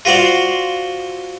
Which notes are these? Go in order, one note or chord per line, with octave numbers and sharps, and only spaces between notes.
F4 F#4 C5 D5 F5